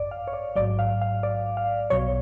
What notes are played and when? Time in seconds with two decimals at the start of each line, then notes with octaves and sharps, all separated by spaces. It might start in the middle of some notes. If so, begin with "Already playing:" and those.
Already playing: G#1 F#2 D5
0.11 F5
0.27 C#5
0.33 D5
0.56 A1 G#2 F#3 D5
0.79 F5
1.01 F5
1.23 D5
1.57 F5
1.90 B1 B2 F#3 C#5